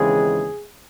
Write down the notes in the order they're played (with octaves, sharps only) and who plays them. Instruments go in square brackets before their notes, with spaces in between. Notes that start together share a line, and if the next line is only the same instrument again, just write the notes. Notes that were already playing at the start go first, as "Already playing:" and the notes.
Already playing: [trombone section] D#2 C#3 E3 G#3 C4 G#4